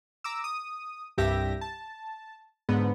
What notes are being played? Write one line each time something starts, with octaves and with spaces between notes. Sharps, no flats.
A#5 D6 E6
D#6
C2 G2 G4 E5 A#6
A5
G#2 D3 B3